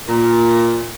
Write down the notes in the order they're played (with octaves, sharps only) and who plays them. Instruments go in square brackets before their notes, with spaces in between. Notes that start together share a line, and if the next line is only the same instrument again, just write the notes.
[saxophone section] A#2